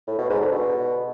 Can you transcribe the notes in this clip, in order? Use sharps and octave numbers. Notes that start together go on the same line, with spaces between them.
A2
B2
G#2
D3
B2